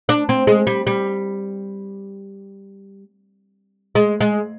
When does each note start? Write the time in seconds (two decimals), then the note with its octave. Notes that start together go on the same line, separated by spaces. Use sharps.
0.09 D4
0.29 C4
0.47 G#3
0.67 G3
0.87 G3
3.95 G#3
4.21 G#3